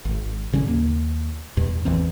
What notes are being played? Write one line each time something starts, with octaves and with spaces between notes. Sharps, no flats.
G#1
A1 C#3 G3 C#4
D#2 A#3
E2 G2 B2
G#1 E2 E3 C4